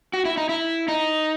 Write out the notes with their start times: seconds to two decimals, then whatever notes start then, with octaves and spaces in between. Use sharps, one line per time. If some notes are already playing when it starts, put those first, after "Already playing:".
0.13 F#4
0.25 E4
0.37 D#4
0.49 E4
0.88 D#4